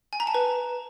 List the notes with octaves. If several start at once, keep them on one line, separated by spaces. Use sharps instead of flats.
G#5
A#5
A5
B4